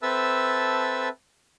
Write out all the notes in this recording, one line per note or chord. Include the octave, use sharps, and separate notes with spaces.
C4 A4 B4 E5 A5 E6